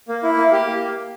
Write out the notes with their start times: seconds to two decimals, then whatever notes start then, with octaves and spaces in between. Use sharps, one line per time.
0.08 A#3
0.23 E4
0.37 A#3
0.52 G4
0.67 A#3